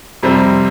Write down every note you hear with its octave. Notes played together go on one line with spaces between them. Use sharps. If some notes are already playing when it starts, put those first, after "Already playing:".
F2 C3 G3 C4